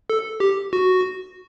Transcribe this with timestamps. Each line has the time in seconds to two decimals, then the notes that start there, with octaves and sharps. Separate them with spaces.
0.10 A4
0.40 G4
0.73 F#4